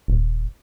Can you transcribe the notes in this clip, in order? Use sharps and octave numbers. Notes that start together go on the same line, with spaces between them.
D#1